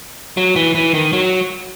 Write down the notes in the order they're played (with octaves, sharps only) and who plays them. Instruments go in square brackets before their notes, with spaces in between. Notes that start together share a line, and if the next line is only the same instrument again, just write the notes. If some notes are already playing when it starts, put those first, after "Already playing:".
[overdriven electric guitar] F#3
E3
E3
D#3
F#3